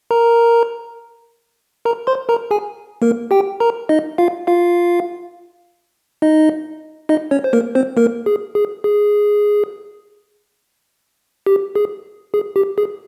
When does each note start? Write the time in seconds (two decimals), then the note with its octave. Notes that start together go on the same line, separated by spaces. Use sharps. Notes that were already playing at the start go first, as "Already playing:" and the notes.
0.11 A#4 A#5
1.85 A#4 A#5
2.07 C5 C6
2.29 A#4 A#5
2.51 G#4 G#5
3.02 A#3 A#4
3.31 G4 G5
3.60 A#4 A#5
3.89 D#4 D#5
4.18 F4 F5
4.47 F4 F5
6.22 D#4 D#5
7.09 D#4 D#5
7.31 C#4 C#5
7.44 C5
7.53 A#3 A#4
7.75 C4 C5
7.97 A#3 A#4
8.26 G#4
8.55 G#4
8.84 G#4
11.47 G4
11.75 G#4
12.34 G#4
12.56 G4
12.78 G#4